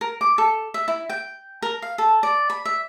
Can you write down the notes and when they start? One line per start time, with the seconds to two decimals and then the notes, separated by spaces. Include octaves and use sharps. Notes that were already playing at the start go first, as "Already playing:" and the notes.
0.01 A#4
0.21 D6
0.38 A4
0.74 E5
0.88 E4
1.10 G5
1.62 A#4
1.82 F5
1.98 A4
2.23 D5
2.50 B5
2.65 E5